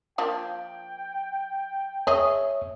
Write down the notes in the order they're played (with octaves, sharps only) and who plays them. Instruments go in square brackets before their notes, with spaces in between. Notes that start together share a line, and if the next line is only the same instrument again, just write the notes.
[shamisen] F3 A#3 D4 [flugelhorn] G5
[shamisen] G#4 D#5 [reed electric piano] C#5 E5